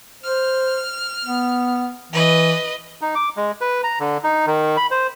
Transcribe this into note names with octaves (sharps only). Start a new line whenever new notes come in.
C5 F6
B3
E3 B4 D#5
D#4
D6
G#3
B4
A#5
D3
D#4
D#3
B5
C5